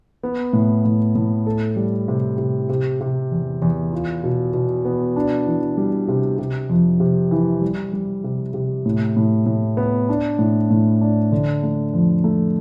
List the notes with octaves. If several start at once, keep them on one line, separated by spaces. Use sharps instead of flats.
B3
A2
A2
A2
A4
G3
C3
C3
C3
C3
E2
E2
F4
B2
B2
B3
D4
E3
G3
C3
C3
F2
C3
E3
G3
G3
C3
C3
A2
A2
A2
B3
D4
A2
A2
D4
D3
A3
F2
A3